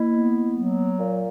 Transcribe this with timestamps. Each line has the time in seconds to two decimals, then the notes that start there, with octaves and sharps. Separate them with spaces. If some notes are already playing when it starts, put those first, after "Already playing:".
Already playing: A#3 E4
0.10 B3
0.54 F#3
0.97 A#2